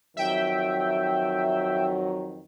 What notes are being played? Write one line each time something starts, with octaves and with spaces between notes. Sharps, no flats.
F2 D#3 F#3 E5 G5